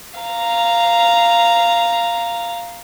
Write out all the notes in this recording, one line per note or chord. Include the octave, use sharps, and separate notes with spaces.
F5 A#5